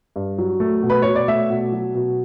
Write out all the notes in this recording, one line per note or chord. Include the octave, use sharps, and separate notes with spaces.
G2
F#3
A3
B2
B4
B2 C#5
D5
A3 E5
B2
F#3
B2